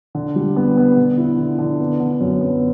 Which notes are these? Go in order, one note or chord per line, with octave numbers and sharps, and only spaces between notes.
D3
G3
B3
B3
D3
E4
D3
D3
B3
D3
F#2
B3